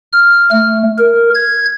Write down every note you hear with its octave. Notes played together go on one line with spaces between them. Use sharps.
F6
A3
A#4
G#6